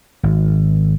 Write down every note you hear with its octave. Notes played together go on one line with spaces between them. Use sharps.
G#1